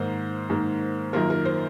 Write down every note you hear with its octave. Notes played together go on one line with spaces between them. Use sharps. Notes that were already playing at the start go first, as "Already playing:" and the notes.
Already playing: G#2 D#3 A#3 C5
G#2 D#3 A#3
F#2 D#3 A#3 F4 A#4
A#4
C5